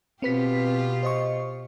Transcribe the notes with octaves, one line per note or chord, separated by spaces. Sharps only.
B2 C4 F4 G4 B4 B6
C5 D#5 C#6